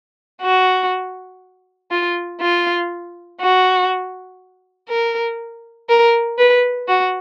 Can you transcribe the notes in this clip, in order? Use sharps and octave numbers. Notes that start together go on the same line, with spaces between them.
F#4
F4
F4
F#4
A#4
A#4
B4
F#4